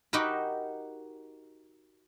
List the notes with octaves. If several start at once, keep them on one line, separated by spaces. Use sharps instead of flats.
D#4 F#4 G4 A#4 B5